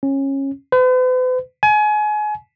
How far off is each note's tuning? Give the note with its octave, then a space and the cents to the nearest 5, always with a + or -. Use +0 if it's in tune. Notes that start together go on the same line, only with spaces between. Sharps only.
C#4 -20
B4 +45
G#5 +30